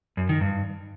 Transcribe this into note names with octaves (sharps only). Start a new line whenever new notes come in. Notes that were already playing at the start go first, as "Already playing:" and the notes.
F#2
D#3
G2